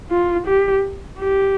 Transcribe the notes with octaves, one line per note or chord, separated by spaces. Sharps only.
F4
G4
G4